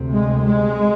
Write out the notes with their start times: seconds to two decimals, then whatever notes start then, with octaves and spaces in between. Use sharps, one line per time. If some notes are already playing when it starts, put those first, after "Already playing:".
Already playing: D2 C3
0.13 G#3
0.45 G#3